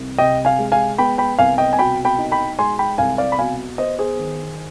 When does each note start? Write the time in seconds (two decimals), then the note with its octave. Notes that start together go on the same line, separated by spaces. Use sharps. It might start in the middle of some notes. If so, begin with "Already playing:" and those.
Already playing: C2
0.18 C3 D#5 G5
0.45 F5 G#5
0.58 G#3
0.72 F5 G#5
0.98 B3 G5 B5
1.18 G5 B5
1.39 C2 F5 G#5
1.58 D#5 G5
1.73 G#5
1.79 B2 G5 B5
2.05 G5 B5
2.18 D#4
2.31 G5 B5
2.58 G#3 G#5 C6
2.79 G5 B5
2.98 C2 F5 G#5
3.18 D5 F5
3.32 B5
3.38 B2 F5 G#5
3.78 B3 C5 D#5
3.99 G#4 C5
4.19 D#3